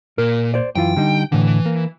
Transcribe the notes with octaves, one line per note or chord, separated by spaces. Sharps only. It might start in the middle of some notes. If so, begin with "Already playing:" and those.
A#2 A#4
C5 D5
F#2 E3 F4 G5
D3 G3 D#4
A2 D3 E3
A#3